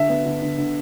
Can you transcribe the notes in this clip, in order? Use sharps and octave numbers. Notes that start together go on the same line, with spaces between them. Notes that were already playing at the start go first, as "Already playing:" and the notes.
Already playing: D3 E5
B3
D3
D3
D3